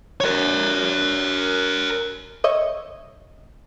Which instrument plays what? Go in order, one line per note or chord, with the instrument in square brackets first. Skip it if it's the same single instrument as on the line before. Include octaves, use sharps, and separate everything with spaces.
[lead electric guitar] A#4 C#5
[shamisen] C#5 D#5 E5